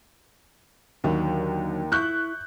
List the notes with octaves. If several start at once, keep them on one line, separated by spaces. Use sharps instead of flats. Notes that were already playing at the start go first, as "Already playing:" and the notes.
D#2 D3 D#3 F#3
E4 C#6 F#6 G6